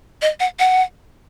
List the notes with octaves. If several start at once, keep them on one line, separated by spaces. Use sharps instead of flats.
D#5
F#5
F#5